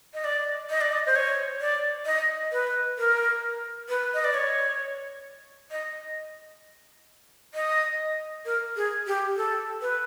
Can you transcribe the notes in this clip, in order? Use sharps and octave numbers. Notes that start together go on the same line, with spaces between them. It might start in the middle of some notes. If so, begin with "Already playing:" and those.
D#5
D5
D#5
D5
D#5
C5
C#5
D5
D#5
B4
A#4
B4
D#5
D5
C#5
D#5
D#5
A#4
G#4
G4
A4
B4